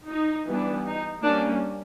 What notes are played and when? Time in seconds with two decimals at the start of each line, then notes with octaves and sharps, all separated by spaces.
0.08 D#4
0.47 E3 G3 B3 D4
0.85 D#4
1.23 G3 A#3 C#4 D4